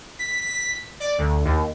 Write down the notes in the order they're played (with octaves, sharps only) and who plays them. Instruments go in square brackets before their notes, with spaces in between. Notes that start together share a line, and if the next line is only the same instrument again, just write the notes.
[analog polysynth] B6
D5
D2
D#2